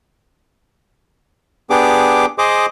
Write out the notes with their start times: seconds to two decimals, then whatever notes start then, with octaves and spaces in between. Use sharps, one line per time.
1.70 B3 D4 G4 G#4 D6
2.38 G#4 C5 D#5 D6